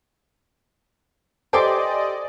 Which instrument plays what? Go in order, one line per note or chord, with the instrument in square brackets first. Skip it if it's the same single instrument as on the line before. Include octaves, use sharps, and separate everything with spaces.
[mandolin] G4 C6 D6 [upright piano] A4 C5 G#5 [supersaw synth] D5 D#5